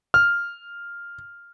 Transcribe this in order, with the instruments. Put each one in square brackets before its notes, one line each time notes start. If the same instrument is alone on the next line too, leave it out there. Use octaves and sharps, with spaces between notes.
[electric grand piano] F6